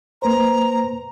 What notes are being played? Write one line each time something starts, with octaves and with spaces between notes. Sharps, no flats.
A#3 B4 C5 A#5